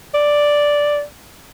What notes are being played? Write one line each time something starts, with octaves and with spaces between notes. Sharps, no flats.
D5